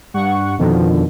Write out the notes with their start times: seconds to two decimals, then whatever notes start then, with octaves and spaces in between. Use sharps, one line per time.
0.14 G2 F#5 C#6
0.58 F2 B2 D3 D#3 F3